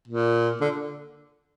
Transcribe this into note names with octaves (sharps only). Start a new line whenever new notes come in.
A#2
D3